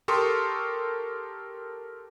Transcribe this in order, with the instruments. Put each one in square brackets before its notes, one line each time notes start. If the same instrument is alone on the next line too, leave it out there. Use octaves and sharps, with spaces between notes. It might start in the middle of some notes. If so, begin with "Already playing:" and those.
[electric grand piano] G4 A4 A#4 C6 C#6 D#6